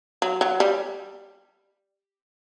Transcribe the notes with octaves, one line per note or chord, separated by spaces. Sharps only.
F#3
F#3
G3